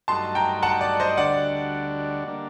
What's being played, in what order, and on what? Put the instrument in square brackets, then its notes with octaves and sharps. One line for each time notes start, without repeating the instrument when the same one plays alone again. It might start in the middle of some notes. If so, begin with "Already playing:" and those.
[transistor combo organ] G2 F#3 A3 D#4 F#4 [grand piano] A5 C6
[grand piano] G5 A#5
F#5 A5
D5
C5 D#5
[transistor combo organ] D2 D3 G3 D4 F#4 [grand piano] D5 F#5
[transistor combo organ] D3 G3 A#3 D4